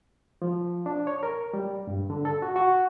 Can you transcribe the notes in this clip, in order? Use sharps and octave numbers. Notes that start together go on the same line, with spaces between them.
F3
D4
C#5
A#4
G3
G2
D3
A4
F#4
F#4